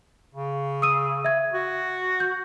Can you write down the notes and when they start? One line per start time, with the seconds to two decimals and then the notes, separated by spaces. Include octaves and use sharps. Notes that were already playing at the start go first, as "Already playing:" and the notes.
0.34 C#3
0.82 D#6 E6 D#7
1.25 E5 G#6
1.53 F#4
2.20 G6